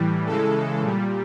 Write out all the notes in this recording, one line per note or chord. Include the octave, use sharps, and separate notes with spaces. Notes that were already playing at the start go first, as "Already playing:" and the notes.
Already playing: A2 E3 G3
C#3 E3 G#3 A4
A#2 G3